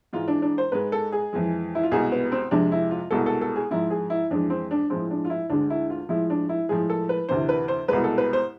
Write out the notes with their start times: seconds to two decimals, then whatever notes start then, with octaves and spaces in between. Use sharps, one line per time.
0.13 G#2 E3 G#3 F4
0.28 D4
0.42 D4
0.58 C5
0.72 G#2 G#3 B4
0.92 A4
1.12 G#4
1.33 F2 E3 G#3
1.75 E4
1.83 F4
1.91 C2 B2 G#3 G#4
2.12 B3
2.32 C4
2.51 F2 C3 F3 G#3 D4
2.72 E4
2.91 F4
3.11 C2 B2 G#3 A4
3.26 A4
3.41 A4
3.56 G#4
3.70 G#2 F3 G#3 E4
3.90 G#4
4.10 E4
4.31 F2 E3 G#3 D4
4.50 C4
4.71 D4
4.90 A2 F3 G#3 C4
5.11 D4
5.25 F4
5.30 E4
5.50 D2 D3 G#3 D4
5.70 E4
5.90 F4
6.09 A2 F3 G#3 E4
6.30 D4
6.49 E4
6.69 A2 F3 G#3 G#4
6.90 A4
7.09 B4
7.29 D2 C3 E3 C5
7.49 B4
7.68 C5
7.88 C2 B2 G#3 B4
8.04 A4
8.18 B4
8.33 C5